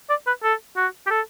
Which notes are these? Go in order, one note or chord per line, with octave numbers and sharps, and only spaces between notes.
D5
B4
A4
F#4
G4
A4